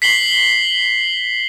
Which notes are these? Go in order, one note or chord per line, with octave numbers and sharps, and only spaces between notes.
B6 C7 F#7 G7